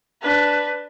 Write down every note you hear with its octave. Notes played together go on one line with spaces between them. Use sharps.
D4 B4